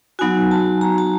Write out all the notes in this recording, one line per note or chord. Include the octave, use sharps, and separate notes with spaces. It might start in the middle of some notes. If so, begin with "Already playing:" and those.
F#3 B3 D#4 F#4 G#5
A5
A#5
A5